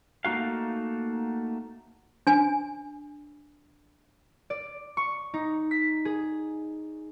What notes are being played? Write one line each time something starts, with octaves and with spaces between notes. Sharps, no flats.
A3 A#3 D#4 F#4 F5
D4 G#5
D5
C#6
D#4
B6
G#4